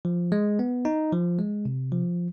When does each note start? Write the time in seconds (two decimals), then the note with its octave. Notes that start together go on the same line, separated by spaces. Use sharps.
0.05 F3
0.32 G#3
0.59 B3
0.85 D#4
1.13 F3
1.39 G#3
1.65 C3
1.92 F3